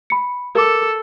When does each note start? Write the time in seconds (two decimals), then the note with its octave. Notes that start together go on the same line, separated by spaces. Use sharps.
0.10 B5 C#7
0.55 A4 A#4 D6